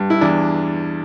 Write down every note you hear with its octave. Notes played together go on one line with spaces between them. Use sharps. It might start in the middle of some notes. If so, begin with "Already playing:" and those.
Already playing: G2
E4
E2 D4